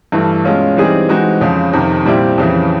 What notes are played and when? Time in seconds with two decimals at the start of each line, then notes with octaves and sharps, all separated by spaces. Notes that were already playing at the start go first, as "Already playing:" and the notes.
0.12 G2 E3 A3
0.44 B2 G#3 C#4 F4
0.76 E3 G3 C4 D#4 G#4
1.09 E3 G#3 C4 D#4 F#4
1.41 F2 C#3 F3
1.73 F2 C3 D#3
2.05 A#2 G3 C4 E4 G4
2.38 F2 C#3 E3